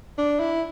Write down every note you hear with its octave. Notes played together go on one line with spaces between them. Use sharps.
D4
E4